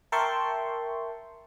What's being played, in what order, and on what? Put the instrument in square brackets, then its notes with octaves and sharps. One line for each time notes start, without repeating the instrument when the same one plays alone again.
[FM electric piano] A#4 E5 G5 A5 C6 C#6